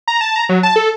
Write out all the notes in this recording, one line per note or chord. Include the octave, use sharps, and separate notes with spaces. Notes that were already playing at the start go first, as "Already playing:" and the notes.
A#5
A5
A#5
F#3
A5
A4